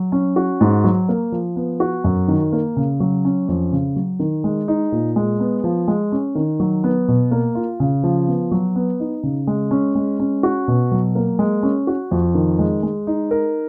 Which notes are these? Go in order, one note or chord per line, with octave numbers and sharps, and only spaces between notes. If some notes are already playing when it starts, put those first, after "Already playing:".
Already playing: F#3
C#4
F#4
G#2
F#3
A#3
F3
B3
F#4
F#2
D#3
A#3
C#3
F#3
C#4
F2
C#3
F#3
D#3
G#3
D#4
A#2
G#3
B3
F3
G#3
C#4
D#3
F#3
B3
B2
A#3
F4
C#3
F3
B3
F#3
B3
D#4
C#3
G#3
C#4
G#3
C#4
F#4
B2
F#3
A#3
G#3
C#4
F#4
F2
D#3
G#3
G#3
D#4
A#4